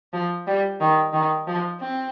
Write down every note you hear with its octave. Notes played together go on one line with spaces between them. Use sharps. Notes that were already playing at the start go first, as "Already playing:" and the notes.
F3
G3
D#3
D#3
F3
C4